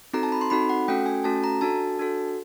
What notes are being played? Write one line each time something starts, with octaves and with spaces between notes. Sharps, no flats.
C4 D#4 F#4 A4 A#5
A5
B5
C6
C4 D#4 F#4 A4 B5
F#5
A3 C#4 F#4 A4 G5
G#5
A3 C#4 F#4 A4 A5
A#5
D4 F#4 A4 A5
D4 F#4 A4